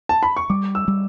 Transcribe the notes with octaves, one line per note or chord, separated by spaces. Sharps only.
A5
B5
C#6
G3 D6
E6
G3